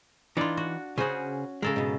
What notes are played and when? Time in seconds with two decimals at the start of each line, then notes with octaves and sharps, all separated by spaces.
0.37 E3 D4 D#4 F4 D5
0.57 F#4
0.98 C#3 C#4 F#4 G#4 C5
1.62 C#3 G#3 A4 A#4
1.76 G#2 B2